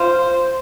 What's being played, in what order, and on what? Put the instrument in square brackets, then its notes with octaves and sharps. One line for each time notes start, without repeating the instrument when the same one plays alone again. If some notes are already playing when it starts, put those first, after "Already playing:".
Already playing: [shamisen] F4 [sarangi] C5